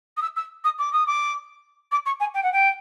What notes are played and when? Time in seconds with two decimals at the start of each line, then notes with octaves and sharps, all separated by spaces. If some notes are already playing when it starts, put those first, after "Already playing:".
0.17 D#6
0.22 E6
0.36 E6
0.64 D#6
0.79 D6
0.93 D#6
1.07 D6
1.92 D6
2.06 C#6
2.20 G#5
2.34 G5
2.43 F#5
2.53 G5